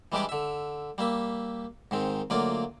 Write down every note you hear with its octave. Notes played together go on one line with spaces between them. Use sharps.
E3 G3 G#3 D4 G4 D5
D3 E5
G3 A#3 E5
G#2 D#3 C4
D2 F#3 A#3 F4 D5